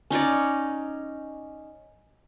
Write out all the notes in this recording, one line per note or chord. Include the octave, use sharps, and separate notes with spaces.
C#4 D#4 C#5 D5